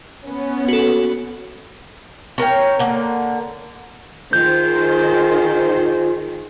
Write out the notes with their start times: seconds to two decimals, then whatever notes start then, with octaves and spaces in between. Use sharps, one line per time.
0.25 B3 C#4
0.68 F#4 A4
2.38 C#4 A#4 C#5 G5
2.79 D3 A#3
4.33 D#3 F4 G#4 C5 G6